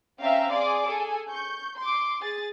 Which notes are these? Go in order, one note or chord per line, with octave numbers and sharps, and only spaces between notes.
C4 C#4 E5 F5 G5 A#5
G#4 D5 C6 D6
G#4 A4 G#5
C#6 G6
C6 D6
G#4 A6